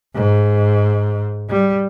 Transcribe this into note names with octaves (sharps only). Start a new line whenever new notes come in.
G#2
G3